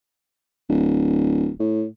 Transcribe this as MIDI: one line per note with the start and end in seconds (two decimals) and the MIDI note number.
0.69 1.50 26
1.60 1.85 45